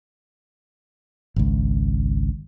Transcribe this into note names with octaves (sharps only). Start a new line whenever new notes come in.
G#1 C#2